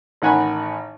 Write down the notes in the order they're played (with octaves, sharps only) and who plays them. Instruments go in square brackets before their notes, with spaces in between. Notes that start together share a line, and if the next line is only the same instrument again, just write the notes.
[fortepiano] A1 D#3 F#5 G#5 A#5 B5